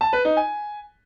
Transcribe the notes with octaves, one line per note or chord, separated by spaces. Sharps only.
A5
B4
D#4
G#5